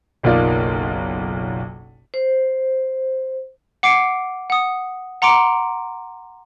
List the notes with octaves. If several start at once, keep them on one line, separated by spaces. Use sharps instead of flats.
F#1 B1 A#3 D#4 F4 D5
C5
F#5 D6 C7 D7
F#5 D#6
F#5 A#5 C6 D6 D7